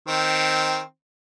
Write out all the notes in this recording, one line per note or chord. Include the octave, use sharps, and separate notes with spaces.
D#3 C4